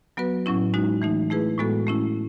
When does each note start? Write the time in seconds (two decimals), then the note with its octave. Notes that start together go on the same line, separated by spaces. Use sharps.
0.17 F#3 B3 F#4 B4
0.46 A2 F#3 C#4 E4
0.74 G#3 D#4 F#4
1.02 E3 A3 D#4
1.30 A3 E4 G#4 B4
1.58 A2 G#3 B3 F#4 A4
1.87 A3 C#4 E4